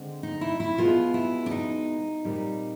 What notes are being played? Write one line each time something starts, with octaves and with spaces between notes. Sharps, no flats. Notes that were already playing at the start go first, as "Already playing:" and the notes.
Already playing: D3 G#3 C4
D#4
E4
E4
B2 G#3 B3 F4
E4
D4
D#4
A#2 G3 C4